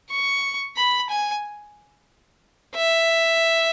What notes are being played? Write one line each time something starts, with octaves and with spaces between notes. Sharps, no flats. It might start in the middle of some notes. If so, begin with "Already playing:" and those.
C#6
B5
G#5
E5